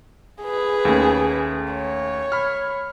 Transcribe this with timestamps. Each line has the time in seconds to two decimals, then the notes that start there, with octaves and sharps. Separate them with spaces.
0.43 G#4 B4
0.85 D#2 A3 C#4
1.73 C#5
2.32 B5 F6